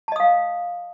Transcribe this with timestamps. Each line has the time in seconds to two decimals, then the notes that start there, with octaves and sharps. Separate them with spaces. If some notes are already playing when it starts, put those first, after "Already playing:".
0.08 A5
0.12 D#5
0.16 D#6
0.20 F5